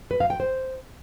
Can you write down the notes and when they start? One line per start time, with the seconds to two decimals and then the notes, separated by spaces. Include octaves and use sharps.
0.11 B4
0.20 F5
0.30 G5
0.40 C5